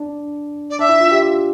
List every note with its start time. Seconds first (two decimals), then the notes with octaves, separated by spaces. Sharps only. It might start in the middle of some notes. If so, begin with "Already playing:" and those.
Already playing: D4
0.70 D5
0.79 D4 E5
0.89 E4
1.00 F4
1.11 G4
1.22 F4